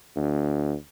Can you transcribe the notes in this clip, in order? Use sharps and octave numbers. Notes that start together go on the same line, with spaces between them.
D2